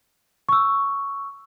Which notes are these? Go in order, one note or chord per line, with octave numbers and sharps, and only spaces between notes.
C#6 E6